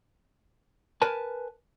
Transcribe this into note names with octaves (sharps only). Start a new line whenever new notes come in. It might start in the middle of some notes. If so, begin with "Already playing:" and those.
A#4 B4 G#5 A5